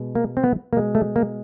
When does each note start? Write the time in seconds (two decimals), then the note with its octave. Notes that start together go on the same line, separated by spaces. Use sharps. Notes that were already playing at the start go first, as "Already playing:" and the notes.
Already playing: B2 G#3
0.15 A#3
0.37 C4
0.44 B3
0.73 B2 G#3 A#3
0.95 A3
1.16 A#3